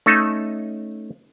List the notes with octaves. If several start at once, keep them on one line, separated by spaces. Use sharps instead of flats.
A3 C#4 D#4 A4